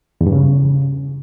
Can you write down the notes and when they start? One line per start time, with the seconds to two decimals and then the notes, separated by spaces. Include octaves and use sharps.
0.21 E2
0.27 G2
0.32 C#3